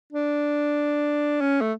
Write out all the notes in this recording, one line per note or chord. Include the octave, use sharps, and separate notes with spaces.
D4
C#4
A3